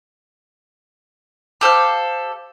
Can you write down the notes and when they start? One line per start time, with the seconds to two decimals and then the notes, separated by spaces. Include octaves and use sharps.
1.61 G4 A4 C5 F5